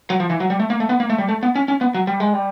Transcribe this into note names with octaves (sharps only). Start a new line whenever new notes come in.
F#3
F3
E3
F#3
G3
A3
A#3
A3
B3
A#3
A3
G3
A3
B3
C#4
C#4
B3
F#3
G3
G#3
G3